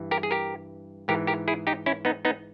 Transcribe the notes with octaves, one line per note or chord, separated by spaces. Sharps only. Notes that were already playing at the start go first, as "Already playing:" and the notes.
Already playing: G2 E3
G4 A#4
G#4
G4 A#4
G#2 E3 G4 A#4
G4 A#4
E4 G#4
D#4 G4
C#4 E4
B3 D#4
B3 D#4